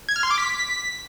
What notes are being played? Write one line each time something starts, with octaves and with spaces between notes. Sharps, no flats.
G#6
F6
C6
D6
B6